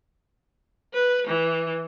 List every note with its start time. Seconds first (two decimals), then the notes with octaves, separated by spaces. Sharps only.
0.94 B4
1.28 E3